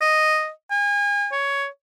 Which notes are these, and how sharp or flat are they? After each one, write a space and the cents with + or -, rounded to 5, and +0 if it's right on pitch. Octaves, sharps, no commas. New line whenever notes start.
D#5 -5
G#5 -35
C#5 +10